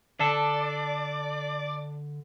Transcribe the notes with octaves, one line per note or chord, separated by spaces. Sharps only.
D3 D4 A4 D5